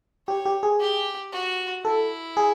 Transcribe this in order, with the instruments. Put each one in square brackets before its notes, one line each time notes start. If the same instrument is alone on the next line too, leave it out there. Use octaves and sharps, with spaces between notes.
[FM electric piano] G4 [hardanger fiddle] C#5
[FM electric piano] G4
G#4
[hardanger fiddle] G4
F#4
[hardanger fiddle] E4 [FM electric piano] A4
[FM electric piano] G#4